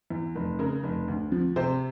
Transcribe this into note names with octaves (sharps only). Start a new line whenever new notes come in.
E2
F1
C#3 A#4
F1
D2
F3
C3 C5